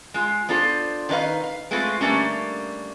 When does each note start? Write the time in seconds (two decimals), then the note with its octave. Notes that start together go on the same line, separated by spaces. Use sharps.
0.14 G#3 F4
0.49 B3 D4 F4 A4 B4 C5
1.09 D#3 D4 D#4 B4 F5
1.44 F5
1.71 G#3 A3 C4 F4 B4
2.01 D3 G3 A3 A#3 C#4